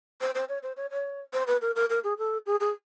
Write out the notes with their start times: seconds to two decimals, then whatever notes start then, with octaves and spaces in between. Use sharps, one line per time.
0.21 C5
0.35 C5
0.49 C#5
0.63 C5
0.77 C#5
0.91 C#5
1.33 C5
1.47 B4
1.61 A#4
1.76 A#4
1.90 A#4
2.04 G#4
2.18 A4
2.46 G#4
2.60 G#4